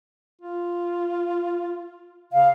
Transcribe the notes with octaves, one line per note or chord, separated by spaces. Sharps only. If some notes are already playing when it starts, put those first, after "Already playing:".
F4
C#3 F5